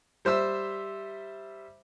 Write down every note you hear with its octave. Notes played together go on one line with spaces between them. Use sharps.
G3 C5 E5 E6